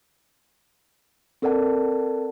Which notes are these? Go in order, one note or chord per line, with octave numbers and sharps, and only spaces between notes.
C4 A4 A#4 D5 F#5 A5